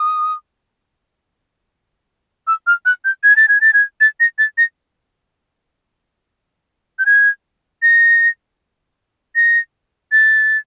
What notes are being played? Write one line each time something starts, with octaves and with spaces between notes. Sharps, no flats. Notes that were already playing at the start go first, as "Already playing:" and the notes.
Already playing: D#6
E6
F6
F#6
G6
G#6
A6
G#6
A6
G#6
A6
A#6
A6
A#6
G6
G#6
A#6
A#6
A6